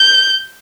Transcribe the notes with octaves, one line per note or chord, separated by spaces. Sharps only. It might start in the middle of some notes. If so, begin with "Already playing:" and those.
Already playing: G6